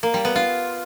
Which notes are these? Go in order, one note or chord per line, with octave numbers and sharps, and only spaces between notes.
A#3
G3
B3
F4